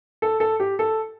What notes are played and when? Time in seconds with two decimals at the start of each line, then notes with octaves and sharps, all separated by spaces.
0.22 A4
0.40 A4
0.60 G4
0.79 A4